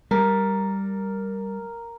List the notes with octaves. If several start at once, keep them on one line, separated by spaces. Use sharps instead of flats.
G3 A#4